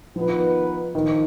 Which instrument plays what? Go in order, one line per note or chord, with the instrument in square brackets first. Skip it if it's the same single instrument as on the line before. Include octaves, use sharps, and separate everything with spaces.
[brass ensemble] D#3 B3 D#4 B4 [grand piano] F3
[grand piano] D#3 [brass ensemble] F3